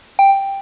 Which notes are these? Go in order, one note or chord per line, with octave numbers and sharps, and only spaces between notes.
G5